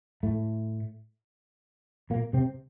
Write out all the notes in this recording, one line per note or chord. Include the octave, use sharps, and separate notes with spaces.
A2 A3
A#2 A#3
C3 C4